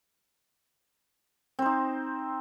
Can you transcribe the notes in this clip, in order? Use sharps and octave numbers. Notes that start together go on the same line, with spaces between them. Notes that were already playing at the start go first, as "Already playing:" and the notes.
C4 D#4 C5